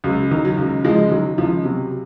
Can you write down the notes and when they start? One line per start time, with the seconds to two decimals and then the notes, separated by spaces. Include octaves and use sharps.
0.04 C#2 F#3
0.31 D#3
0.45 F#3
0.57 C#2
0.84 C#2 F3 G#3
1.11 D#3 F#3
1.38 C#2 F3
1.64 C3 F#3